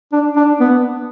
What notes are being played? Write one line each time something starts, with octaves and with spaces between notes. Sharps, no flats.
D4
D4
B3